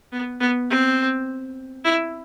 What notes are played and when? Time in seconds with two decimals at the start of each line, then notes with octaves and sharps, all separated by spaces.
0.12 B3
0.40 B3
0.69 C4
1.84 E4